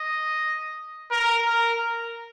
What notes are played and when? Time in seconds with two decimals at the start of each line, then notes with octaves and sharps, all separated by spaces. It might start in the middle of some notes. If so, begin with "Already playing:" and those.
Already playing: D#5
1.11 A#4
1.47 A#4